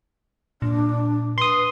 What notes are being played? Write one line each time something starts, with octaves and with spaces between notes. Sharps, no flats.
A#2 D4
B4 C6 D#6